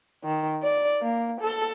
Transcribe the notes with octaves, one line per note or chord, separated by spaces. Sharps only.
D#3
D5
A#3
A4